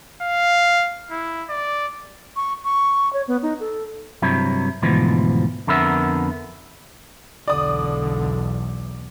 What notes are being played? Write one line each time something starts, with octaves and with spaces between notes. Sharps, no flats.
F5
E4
D5
C#6
C#6
C#5
B3
D#4
A4
G2 C3 F#3 E4
D2 G#2 B2 E3 F3
F2 D3 B3 A#4 E5
B1 E2 D3 D5 D#6